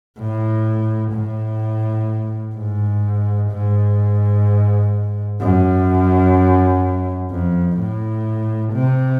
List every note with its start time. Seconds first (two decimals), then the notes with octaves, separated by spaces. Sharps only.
0.18 A2
1.13 A2
2.56 G#2
3.51 G#2
5.41 F#2
7.31 F2
7.79 A2
8.73 C3